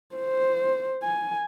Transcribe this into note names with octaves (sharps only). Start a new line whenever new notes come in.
C5
G#5